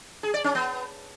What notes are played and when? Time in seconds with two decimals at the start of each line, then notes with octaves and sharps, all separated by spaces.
0.23 G#4
0.34 D5
0.44 C#4
0.55 B3